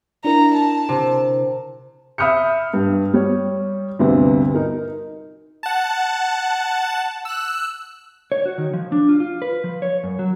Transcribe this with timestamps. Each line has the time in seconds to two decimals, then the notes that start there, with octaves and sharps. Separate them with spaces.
0.25 D4 E4 A#4 A#5
0.55 A5
0.89 C3
2.18 E5 B5 D#6 F6 G6 C#7
2.74 G2
3.13 G3 C#5
3.99 D2 G2 C3 B3
4.54 D#4 A#4
5.63 F#5 A5
7.25 E6 F#6
8.32 C#5
8.46 F#4
8.58 D#3
8.73 F3
8.92 D4
9.09 F4
9.20 F4
9.42 B4
9.64 F3
9.82 C#5
10.03 F#2
10.19 F#3